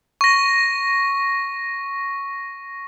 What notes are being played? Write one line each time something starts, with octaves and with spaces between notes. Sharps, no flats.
C#6 A#6